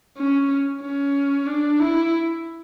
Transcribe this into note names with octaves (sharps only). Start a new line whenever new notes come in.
C#4
C#4
D4
E4